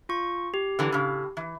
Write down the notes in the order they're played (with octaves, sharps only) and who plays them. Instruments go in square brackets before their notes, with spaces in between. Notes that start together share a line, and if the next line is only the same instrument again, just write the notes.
[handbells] F4 C#6
G4
[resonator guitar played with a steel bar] D3 E3 F#3
A2 C#3
E3